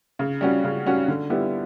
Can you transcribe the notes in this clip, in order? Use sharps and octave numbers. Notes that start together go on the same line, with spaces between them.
C#3
G3 C#4 F#4
C#3
G3 C#4 F#4
D3
G3 B3 E4 G4